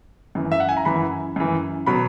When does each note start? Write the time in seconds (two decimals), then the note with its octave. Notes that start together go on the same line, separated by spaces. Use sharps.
0.35 F#2 E3
0.52 E5
0.60 F#5
0.69 G#5
0.77 A#5
0.85 F#2 E3 B5
1.36 F#2 E3
1.86 B2 F#3 B5